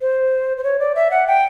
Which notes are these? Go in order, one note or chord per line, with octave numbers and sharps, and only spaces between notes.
C5
C5
C#5
D5
E5
F#5
G5